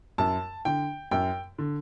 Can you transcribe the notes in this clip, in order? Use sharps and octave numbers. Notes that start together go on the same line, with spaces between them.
F#2 A5
D3 G5
F#2 G5
D3